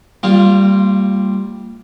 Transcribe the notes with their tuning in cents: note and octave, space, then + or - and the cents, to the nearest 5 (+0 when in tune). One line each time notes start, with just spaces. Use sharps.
G3 +0 A#3 -35 F4 +0